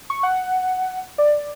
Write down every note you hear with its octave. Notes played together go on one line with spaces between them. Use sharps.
C#6
F#5
D5